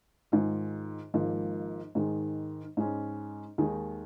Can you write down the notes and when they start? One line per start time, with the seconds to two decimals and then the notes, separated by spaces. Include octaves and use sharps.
0.32 G#2 D#3 G#3 F4
1.14 G#1 G#2 F3 A#3
1.95 G#2 D#3 G#3
2.77 G#2 G#3 C#4
3.58 D#2 D#3 G#3